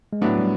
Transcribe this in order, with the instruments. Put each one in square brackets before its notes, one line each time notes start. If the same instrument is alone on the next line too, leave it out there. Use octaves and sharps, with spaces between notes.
[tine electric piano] G#3
[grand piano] A2 F#3 B3 D4 [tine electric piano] A3
[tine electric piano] G3